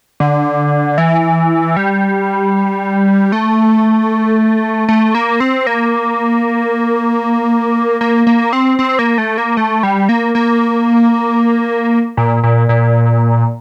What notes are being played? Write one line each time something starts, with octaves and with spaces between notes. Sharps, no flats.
D3
E3
G3
A3
A3
A#3
C4
A#3
A#3
A#3
C4
C4
A#3
A3
A#3
A3
G3
A#3
A#3
A#2
A#2
A#2